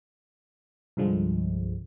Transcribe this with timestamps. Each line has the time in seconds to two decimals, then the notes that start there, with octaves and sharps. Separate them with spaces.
0.97 C2 G2 D3 F3 G#3